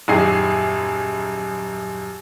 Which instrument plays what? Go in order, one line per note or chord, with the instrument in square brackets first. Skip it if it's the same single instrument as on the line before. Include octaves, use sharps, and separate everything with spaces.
[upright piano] D#1 F#2 D#4 G#4 C7